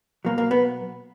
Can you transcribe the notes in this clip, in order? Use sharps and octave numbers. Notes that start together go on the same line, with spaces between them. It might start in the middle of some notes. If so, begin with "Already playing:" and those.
B2 F#3 A#3
A#3
B3